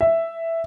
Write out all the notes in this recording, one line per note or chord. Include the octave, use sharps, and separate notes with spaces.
E5